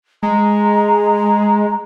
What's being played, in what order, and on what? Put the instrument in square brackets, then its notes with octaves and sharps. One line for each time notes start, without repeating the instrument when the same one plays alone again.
[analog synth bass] G#3 [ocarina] A#5